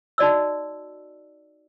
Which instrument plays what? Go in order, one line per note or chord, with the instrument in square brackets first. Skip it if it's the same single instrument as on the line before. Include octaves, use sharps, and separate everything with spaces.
[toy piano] D#4 F#4 D5 D#5 E6